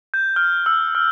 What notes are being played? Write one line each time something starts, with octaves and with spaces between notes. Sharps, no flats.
G6
F6
E6
F6